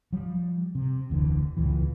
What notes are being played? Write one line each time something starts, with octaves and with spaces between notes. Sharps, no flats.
F3 G3
C3
F1 D2 D3 E3
C#2 A#2 E3